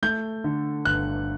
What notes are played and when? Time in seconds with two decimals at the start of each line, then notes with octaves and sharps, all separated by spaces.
0.02 A3 G6
0.44 D3
0.85 G1 F#6